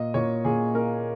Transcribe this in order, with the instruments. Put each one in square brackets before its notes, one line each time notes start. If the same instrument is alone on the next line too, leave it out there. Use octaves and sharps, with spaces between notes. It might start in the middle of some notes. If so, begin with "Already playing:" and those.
Already playing: [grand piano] A#2 D#5
A#2 C#5
A#2 G#4
A#3 A#4